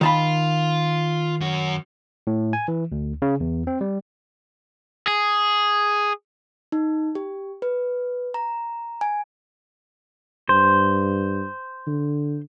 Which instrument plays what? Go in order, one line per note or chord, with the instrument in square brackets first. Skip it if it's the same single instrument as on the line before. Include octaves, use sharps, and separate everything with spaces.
[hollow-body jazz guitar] D#3 A5 B5 [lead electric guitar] F4 F5
[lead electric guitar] F#2 F#4
[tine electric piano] A2
G#5
E3
D2
C#3
E2
C4
G3
[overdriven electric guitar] G#4
[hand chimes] D#4
G4
B4
A#5
G#5
[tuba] G2 [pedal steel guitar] C5
[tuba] D3